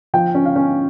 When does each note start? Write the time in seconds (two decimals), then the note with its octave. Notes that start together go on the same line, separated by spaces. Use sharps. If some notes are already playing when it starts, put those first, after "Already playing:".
0.14 F3 G5
0.35 C#4
0.45 F5
0.56 C#4